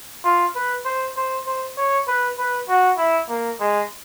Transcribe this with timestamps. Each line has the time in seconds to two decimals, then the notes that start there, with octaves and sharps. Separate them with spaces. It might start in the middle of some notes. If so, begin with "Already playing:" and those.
0.24 F4
0.55 B4
0.85 C5
1.16 C5
1.46 C5
1.77 C#5
2.07 B4
2.38 B4
2.69 F#4
2.98 E4
3.29 A#3
3.60 G#3